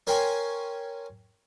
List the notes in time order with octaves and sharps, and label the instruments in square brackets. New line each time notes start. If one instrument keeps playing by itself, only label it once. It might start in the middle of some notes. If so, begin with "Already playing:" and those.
[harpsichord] C#4 A#4 C#5 G5 G#5 C6